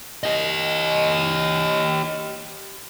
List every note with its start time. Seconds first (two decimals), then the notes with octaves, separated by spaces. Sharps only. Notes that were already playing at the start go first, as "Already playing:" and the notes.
0.24 G4 D#5